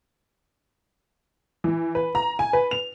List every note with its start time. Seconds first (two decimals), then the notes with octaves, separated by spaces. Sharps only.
1.64 E3
1.95 B4
2.15 A#5
2.39 G#5
2.53 B4
2.71 F7